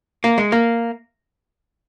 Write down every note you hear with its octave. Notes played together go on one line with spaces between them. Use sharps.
A#3
G#3
A#3